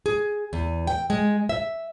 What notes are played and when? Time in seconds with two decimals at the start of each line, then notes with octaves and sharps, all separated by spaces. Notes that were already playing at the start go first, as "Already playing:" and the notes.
0.06 G#4
0.53 E2
0.87 G5
1.10 G#3
1.49 E5